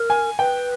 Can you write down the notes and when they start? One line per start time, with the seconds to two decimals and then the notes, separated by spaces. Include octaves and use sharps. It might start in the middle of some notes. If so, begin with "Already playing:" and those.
Already playing: A#4
0.10 G#5
0.39 B4 G5